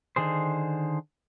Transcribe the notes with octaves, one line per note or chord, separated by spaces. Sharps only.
D3 D#3 G#4 C5